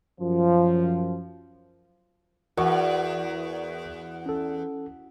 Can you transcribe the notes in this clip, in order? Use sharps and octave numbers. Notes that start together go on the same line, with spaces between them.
F#2 F3
E2 F#4 A#4 D5 C#6
C#4 A4